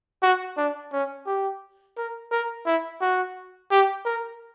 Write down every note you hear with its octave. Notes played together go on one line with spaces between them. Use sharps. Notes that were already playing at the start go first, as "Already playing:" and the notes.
F#4
D4
C#4
G4
A#4
A#4
E4
F#4
G4
A#4